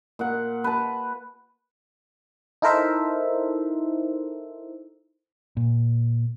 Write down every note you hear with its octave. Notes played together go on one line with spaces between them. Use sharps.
A#2 F#5
B4 A5
D#4 E4 A4 A#4 C5 E5
A#2